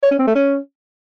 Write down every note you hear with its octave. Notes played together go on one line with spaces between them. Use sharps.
C#5
C#4
C4
A3
C#4